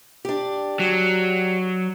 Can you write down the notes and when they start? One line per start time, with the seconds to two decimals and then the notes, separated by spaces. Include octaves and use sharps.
0.25 D4 G4
0.79 F#3